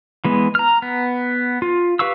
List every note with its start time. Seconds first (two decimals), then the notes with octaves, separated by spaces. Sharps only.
0.25 E3 G#3 B3
0.55 A#5 F6
0.82 B3
1.62 F4
1.99 G4 B4 F5 C#6 E6